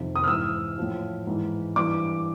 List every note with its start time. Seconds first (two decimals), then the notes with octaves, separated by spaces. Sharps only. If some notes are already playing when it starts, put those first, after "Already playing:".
Already playing: F2 C3 D#3
0.16 D#6
0.24 F6
0.28 G#2 E3 E6
0.78 A2 F3
1.27 G#2 E3
1.76 G2 E3 D6